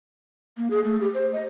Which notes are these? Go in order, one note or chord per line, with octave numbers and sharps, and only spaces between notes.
A#3
G#4
A3
G4
C5
D#5